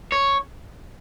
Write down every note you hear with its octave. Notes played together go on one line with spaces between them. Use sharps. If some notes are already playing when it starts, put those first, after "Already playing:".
C#5